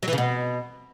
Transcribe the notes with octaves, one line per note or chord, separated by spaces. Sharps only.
F#3
E3
C#3
B2